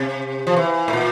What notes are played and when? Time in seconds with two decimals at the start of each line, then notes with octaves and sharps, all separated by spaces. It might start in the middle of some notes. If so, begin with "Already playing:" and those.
Already playing: C3
0.47 F3
0.56 E3
0.88 A2
0.93 A#2